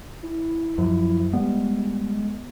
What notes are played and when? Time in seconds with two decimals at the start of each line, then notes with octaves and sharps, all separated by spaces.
0.23 E4
0.78 F#2 F3
1.33 G3 G#3 B3